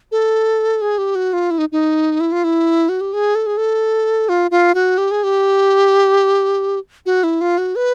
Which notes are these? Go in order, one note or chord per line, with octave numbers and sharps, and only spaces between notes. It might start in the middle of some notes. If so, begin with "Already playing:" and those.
A4
G#4
G4
F#4
F4
E4
D#4
D#4
E4
F4
E4
F#4
G4
G#4
A4
G#4
A4
F4
F4
F#4
G4
G#4
G4
F#4
E4
F4
F#4
B4